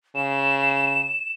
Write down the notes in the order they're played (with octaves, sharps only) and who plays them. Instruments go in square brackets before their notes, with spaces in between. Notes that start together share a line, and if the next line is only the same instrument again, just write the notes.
[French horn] C#3 [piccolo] E7